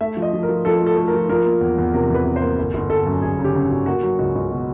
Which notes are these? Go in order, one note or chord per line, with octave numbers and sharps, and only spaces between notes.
A3 E5
F3
D#5
F3
A#4
F3
F3 A4
A3 A4
A3
A#4
F3
F3 A#4
A#3
E2
E2
C3 A#4
E2 B4
C3
C5
A#3
G1
G1
G1 A4
F#2
G1 G#4
C#3
G4
C#3
F#4
G1
A#3 F#4
F#3
C#2 F#4
C#2
B2